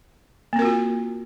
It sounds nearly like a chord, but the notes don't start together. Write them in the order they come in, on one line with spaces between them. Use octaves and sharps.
A#3 C4 A#4 F#4 F4